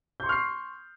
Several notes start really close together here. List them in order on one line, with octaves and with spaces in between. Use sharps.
G6 C6 C#6 F6 C7